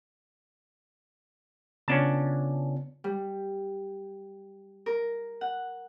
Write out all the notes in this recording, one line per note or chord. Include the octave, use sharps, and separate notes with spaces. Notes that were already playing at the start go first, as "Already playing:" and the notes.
C#3 B3 C#4 D4 F4 A5
G3
A#4
F#5